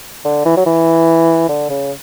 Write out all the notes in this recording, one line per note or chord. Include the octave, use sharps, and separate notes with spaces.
D3
E3
F#3
E3
D3
C#3